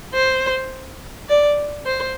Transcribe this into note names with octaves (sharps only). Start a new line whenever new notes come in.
C5
D5
C5